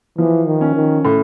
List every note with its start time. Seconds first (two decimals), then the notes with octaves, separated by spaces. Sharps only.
0.18 E3 F3
0.47 D#3
0.61 C#4
0.75 D#3
1.05 A2